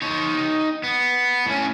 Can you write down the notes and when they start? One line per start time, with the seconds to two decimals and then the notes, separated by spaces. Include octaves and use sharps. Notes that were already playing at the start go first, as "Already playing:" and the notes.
0.02 D#4 C#5
0.83 B3
1.46 A2 C#4